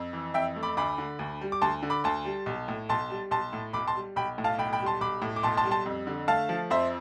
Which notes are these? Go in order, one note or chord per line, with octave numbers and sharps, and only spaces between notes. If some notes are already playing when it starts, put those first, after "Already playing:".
Already playing: F2
E3
F2 E5 G5
A3
B5 D6
D2 B5 D6
D3
D2
G3
D6
D2 A5 C6
D3
B5 D6
D2 A5 C6
G3
B1
A2
B1 A5 C6
G3
B1 A5 C6
A2
B1 B5 D6
A5 C6
G3
B1 G5 B5
A2
F5 A5
B1 G5 B5
G5 B5
G3
A5 C6
B1 B5 D6
A2
D6
B1 A5 C6
A5 C6
G3
A5 C6
F2
D3
A3 F5 A5
F3
F2 C5 E5